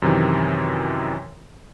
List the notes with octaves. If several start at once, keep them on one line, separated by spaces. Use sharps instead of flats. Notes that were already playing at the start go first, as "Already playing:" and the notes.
F#2 C3 D#3 E3